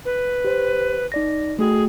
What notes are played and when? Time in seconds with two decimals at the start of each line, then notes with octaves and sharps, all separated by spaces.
0.05 B4
0.45 G4 C5
1.12 D#4 D5 A#6
1.59 A3 F#4 G#4 G5